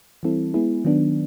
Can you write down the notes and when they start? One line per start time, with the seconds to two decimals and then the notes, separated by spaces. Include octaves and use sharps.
0.23 E3 G3 C4 E4 A4
0.54 G#3 B3 E4 G#4
0.85 D#3 F#3 B3 D4